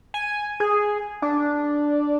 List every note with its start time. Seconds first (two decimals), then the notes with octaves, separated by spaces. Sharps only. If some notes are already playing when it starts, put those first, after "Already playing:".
0.14 G#5
0.60 G#4
1.22 D4